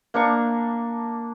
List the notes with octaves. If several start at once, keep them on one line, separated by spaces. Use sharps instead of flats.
A#3 D4 A#5 C#6